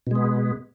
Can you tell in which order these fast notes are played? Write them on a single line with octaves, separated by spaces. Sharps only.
B2 G#3 B3